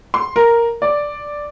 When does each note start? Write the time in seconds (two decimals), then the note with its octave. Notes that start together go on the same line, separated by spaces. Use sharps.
0.14 C6
0.36 A#4
0.82 D5